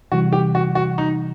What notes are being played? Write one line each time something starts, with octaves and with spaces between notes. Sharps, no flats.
C3 E3 G3 F#4
G4
F#4
F#4
D#4